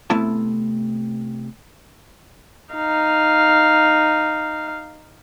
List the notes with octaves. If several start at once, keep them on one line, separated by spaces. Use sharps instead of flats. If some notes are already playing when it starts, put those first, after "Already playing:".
C3 A3 B3 E4 A5
D#4 F5